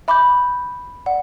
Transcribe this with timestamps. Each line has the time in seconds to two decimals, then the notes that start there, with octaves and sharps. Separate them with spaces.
0.08 E5 B5 D6 G6
1.06 D5 F#5